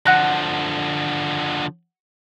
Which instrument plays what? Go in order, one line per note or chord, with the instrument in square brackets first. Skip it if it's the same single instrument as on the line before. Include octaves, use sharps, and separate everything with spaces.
[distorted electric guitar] D3 F3 [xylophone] F#5 F#6 A#6